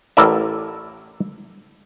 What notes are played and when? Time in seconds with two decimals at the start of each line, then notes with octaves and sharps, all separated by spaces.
0.17 A1 A2 E4 A#4 D5 E5